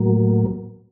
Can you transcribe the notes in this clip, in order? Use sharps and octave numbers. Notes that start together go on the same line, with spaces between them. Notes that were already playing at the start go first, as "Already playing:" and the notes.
Already playing: A2 F#3 A#3